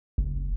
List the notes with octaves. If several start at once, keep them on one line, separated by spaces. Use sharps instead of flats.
F#1